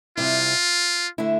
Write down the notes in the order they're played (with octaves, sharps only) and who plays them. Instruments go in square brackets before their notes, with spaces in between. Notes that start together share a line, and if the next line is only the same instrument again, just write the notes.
[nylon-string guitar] C3 G3 C4 E4 [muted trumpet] F4
[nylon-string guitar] D3 A3 E4